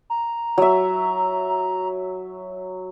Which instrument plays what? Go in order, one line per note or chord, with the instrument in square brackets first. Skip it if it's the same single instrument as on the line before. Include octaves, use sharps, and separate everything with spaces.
[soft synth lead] A#5
[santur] F#3 E5